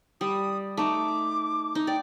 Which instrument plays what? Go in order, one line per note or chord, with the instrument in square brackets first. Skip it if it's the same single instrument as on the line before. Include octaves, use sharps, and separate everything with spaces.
[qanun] G3 [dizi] D#6
[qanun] A3 D#4 [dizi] D6
[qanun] D#4
[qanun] D5 [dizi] G5